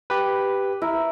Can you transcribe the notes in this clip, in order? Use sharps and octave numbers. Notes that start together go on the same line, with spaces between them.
G4 B4
E4 A#4